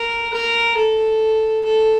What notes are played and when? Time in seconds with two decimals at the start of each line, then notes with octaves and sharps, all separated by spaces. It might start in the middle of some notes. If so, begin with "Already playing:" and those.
Already playing: A#4
0.33 A#4
0.76 A4
1.64 A4